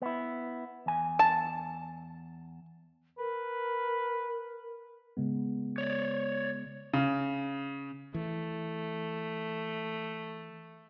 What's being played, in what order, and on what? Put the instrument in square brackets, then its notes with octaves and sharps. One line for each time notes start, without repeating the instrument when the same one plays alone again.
[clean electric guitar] B3 E4
E2 G#5
[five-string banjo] A5
[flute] A#4 [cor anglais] B4
[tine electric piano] C#3 G#3 B3
[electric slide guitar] C#5 D5
[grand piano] C#3
[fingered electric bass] E3 [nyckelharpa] A3